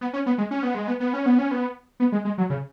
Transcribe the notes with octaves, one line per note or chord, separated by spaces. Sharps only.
B3
C#4
B3
G#3
C#4
B3
G#3
B3
B3
C#4
B3
C#4
B3
B3
G#3
G#3
F#3
C#3